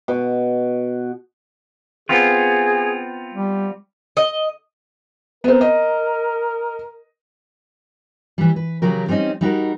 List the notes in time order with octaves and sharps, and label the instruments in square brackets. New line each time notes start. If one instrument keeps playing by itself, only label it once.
[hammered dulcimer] B2
[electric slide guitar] B3 C4 F4 [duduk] G#4
[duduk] G3
[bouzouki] D#5
[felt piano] B3 C4 [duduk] A#4
[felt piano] D#5
[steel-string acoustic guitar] E3 G3
B4
C#3 F#3 G4 A#4
G3 C4 C#4 D#4 D#5
G3 D#4 F#4 A#4